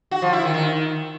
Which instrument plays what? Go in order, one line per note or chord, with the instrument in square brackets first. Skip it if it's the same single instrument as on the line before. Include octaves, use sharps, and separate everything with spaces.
[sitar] F#4
F3
E4
D#3
D#3